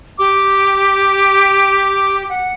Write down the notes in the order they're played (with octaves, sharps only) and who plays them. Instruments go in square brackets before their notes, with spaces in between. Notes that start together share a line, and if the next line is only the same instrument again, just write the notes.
[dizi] G4 [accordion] D6
[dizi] F#5